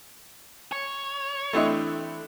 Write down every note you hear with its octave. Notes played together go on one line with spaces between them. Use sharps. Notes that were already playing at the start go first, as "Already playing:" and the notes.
C#5
E3 A3 C4 D4 E4 D#5